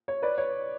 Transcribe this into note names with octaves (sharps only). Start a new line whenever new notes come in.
C#5
B4 D5
C#5